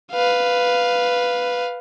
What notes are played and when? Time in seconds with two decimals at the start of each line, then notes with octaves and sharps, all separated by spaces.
0.12 B4 F5